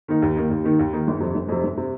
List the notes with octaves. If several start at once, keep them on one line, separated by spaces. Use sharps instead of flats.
D#3 A#3 D#4
D#2
D#3 A#3 D#4
D#2
D#3 A#3 D#4
D#2
D#3 A#3 D#4
G1
F2 C3
G1
F2 C3
G1
C3